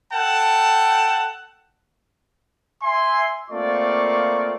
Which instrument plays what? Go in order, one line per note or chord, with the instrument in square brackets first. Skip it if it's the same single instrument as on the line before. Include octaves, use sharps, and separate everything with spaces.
[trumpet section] A4 F#5 G5 A5
E5 G#5 C6
A3 A#3 C4 F4 D5 C#6